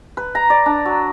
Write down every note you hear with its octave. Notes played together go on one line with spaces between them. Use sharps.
B4
A#5
D5
D4
F#3